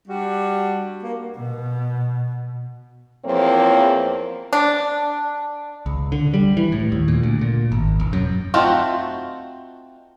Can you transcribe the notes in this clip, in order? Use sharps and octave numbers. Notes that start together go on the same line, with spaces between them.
G3 D4 F#4
A#3
B2
E2 F3 A#3 C4 C#5
D4
C#2
D3
G3
E3
A2
D#2
A#2
D2
A#2
G#1
E1
F#2
A3 C4 D#4 F4 F#4